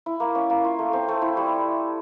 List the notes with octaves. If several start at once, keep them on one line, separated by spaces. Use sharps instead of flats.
E4
A#3
C#4
A#3
F4
A3
C4
A3
E4
G3